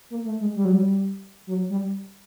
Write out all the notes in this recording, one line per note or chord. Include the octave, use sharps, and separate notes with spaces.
A#3
A3
G#3
G3
F#3
G3
F#3
G3